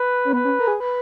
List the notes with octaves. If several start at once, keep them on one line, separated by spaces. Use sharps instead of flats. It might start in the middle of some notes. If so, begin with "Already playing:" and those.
Already playing: B4
C#4
B3 B4
C#4
A#4
G#4
B4